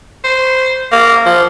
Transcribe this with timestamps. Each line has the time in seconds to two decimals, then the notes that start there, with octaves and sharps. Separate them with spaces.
0.24 C5
0.92 A#3
1.25 F3